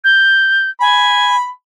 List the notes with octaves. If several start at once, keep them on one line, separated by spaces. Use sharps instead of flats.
G6
G#5 B5